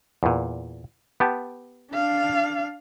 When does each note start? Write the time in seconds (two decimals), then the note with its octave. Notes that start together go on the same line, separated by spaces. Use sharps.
0.23 E2 A#2
1.20 B3 G4 A5
1.92 D4 F5